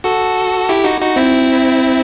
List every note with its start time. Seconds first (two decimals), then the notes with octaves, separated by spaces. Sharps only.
0.04 F#4 A4
0.69 E4 G4
0.84 D#4 F#4
1.01 D#4 F#4
1.16 C4 E4